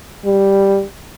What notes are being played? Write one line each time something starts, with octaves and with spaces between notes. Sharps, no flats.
G3